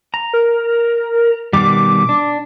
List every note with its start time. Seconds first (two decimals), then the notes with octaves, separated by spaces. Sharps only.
0.14 A#5
0.33 A#4
1.53 B2 D#3 G3 D6
2.09 D4